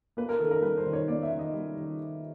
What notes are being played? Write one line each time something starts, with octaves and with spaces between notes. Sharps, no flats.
A#3 B4
A#4
D#3 A4
A#4
G3 B4
C5
D#3
C#5
A#3 D5
E5
D#3
D#5
G3
D#3